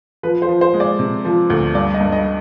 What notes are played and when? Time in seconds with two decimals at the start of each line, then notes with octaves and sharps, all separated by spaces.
0.23 F3 B4
0.42 C5
0.49 F3
0.61 C5
0.74 G#3
0.80 D5
0.99 C3
1.25 F3
1.50 D2
1.75 G2 D5
1.94 D#5
2.01 G2
2.12 D#5